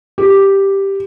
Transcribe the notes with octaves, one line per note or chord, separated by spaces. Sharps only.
G4